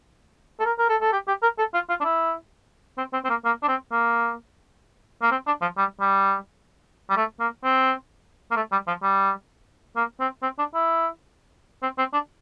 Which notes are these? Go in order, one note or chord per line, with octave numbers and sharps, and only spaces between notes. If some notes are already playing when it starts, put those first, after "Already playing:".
A4
A#4
A#4
A4
A4
G4
G4
A#4
A4
F4
F4
D4
E4
C4
C4
C4
A#3
A#3
D4
C4
A#3
A#3
C4
D4
F3
G3
G3
G3
A3
A#3
C4
A#3
A3
G3
F3
G3
A#3
C4
C4
D4
E4
C4
C4
D4